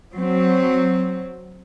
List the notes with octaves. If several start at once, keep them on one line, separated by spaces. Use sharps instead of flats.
F#3 C4